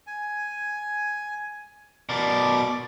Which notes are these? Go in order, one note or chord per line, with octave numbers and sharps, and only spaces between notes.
G#5
B2 A#4 D5 D6